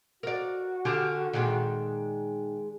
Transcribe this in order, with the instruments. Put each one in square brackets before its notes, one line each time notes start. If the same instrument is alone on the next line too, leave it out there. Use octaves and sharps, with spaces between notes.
[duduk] F#4 [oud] A#4 D5
[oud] D3 G4 G#4 [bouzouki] F5
[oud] A#2 D#3 [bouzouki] G#3 D4